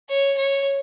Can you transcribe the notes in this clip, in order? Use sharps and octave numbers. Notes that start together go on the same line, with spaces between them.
C#5
C#5